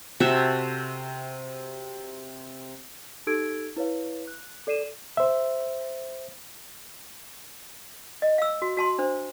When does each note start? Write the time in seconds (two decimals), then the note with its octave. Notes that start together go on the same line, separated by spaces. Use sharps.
0.20 C3 F#4 A4 E5
3.27 D#4 G4 A4 E6 G#6 D7
3.76 E4 B4 C#5 F5
4.27 F#6
4.67 A4 D5 C7 D#7 E7
5.17 C5 E5
8.22 D#5
8.38 F5 E6
8.62 F#4
8.77 F#4 A5 C6
8.98 D4 C5